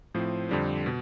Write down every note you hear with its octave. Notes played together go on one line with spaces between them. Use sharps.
A2 F3 C4
F2 D3 G3 C4
B2